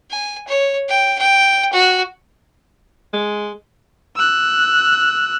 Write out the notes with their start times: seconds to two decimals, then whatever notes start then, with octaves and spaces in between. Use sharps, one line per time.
0.11 G#5
0.48 C#5
0.89 G5
1.19 G5
1.73 F#4
3.13 G#3
4.16 E6 F#6